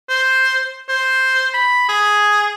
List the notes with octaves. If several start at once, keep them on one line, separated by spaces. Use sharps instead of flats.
C5
C5
B5
G#4